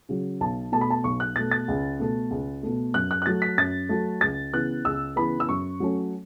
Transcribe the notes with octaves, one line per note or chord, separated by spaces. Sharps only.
C#3 F#3
B1 A5
B2 A3 A5
B5
A5
B1 C#6
F#6
B2 A3 A6
A6
C#2
B2 A3
C#2
B2 A3
F#2 F#6
F#6
F#6
F#3 A3 A6
B6
F#2 A6
F#3 A3
C#2 A6
C#3 E3 B3 F#6
C#2 E6
C#3 E3 B3 B5
E6
F#2 C#6
F#3 A3 C#4